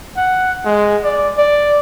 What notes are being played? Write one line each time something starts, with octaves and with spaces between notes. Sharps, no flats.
F#5
G#3
D5
D5